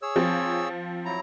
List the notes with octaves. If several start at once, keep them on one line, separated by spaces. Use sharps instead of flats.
G#4 C#5 E6
F3 C4
F#3 E4 A#5